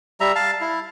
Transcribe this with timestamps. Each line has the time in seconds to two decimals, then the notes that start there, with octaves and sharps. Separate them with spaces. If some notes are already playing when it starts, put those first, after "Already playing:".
0.20 G3 E5 A#5
0.35 F5 A5
0.61 E4